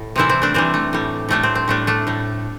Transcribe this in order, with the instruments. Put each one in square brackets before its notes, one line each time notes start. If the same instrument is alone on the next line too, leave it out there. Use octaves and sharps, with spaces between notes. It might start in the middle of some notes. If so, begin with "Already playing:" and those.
Already playing: [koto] A2
C3 E3 G3 C4 E4
C4
A3 D4
C3 E3 G3 C4
A3
A2 G3
A2 G3 A3 D4
C4
C4
A2 G3 A3 D4
A3 D4
A2 G3